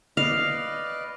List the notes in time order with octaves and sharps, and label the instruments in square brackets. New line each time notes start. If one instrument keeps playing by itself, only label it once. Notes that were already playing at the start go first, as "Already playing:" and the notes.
[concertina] B4 D5 D#5 [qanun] F5